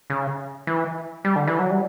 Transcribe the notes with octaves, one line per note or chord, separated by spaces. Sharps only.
C#3
E3
G3
D3
E3
F#3
G3